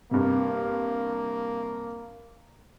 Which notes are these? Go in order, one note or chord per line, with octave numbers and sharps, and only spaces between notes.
G2 C3 A#3